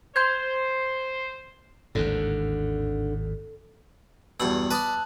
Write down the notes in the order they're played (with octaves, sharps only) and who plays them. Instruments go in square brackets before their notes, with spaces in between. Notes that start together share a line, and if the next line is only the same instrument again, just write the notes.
[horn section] C5 [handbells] C6 G6 G#6
[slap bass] G#1 D#2 A2 [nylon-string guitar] D3
[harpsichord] E2 G2 B2 [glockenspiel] E6 F#7
[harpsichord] B4 D5 D#6 [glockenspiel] A5 F#6